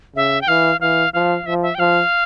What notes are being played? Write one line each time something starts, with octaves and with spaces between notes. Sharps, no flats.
C#3 E5
G5
E3 F5
E3 F5
F3 F5
F3 E5
E5
G5
F3 F5